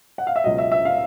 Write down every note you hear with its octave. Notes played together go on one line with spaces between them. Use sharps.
F#5
F5
E5
C#2 B2 F#3 D#5
E5
E5
F5